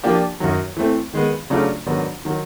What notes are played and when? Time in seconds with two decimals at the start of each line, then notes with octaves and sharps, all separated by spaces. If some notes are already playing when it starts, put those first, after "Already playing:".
0.04 F3 A#3 D4 G4
0.40 F#2 D#3 F#3
0.77 E3 A3 C4
1.14 D#3 G#3 B3
1.50 C#3 F#3 A3 D4 F4
1.86 G#2 D#3 F#3 B3 D4
2.25 D#3 F#3